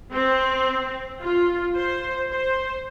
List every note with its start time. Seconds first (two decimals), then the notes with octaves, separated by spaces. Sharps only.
0.13 C4
1.21 F4
1.75 C5
2.30 C5